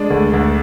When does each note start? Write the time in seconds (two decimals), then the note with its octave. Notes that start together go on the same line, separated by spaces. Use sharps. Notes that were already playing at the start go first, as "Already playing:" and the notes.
Already playing: G#3 D4
0.10 D2
0.33 D2